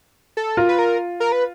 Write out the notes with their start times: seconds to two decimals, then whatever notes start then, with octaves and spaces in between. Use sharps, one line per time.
0.37 A4
0.57 F4 A#4
0.69 B4
0.79 A#4
1.20 A#4
1.32 B4